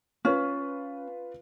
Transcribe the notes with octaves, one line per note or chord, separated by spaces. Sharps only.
C#4 F4 B4